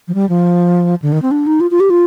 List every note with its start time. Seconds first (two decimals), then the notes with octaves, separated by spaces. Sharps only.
0.08 F3
0.15 G3
0.29 F3
1.02 D3
1.12 D#3
1.22 C4
1.31 D4
1.47 D#4
1.60 F4
1.71 F4
1.80 G4
1.90 F4